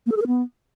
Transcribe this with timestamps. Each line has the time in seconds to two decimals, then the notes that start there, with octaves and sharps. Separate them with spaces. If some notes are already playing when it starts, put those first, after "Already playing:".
0.06 A#3
0.12 A4
0.17 G#4
0.22 A#4
0.27 B3